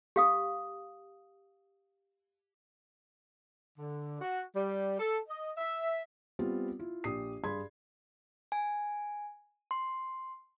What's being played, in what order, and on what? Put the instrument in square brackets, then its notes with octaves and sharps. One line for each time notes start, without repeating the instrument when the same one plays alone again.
[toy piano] G4 F5 D#6
[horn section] D3
F#4
G3
A4
D#5
E5
[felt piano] G3 B3 C4 F4
E4 F4
A#1 G4 D#6 C7
G2 G#4 B5 C6 G#6
[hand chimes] G#5
C6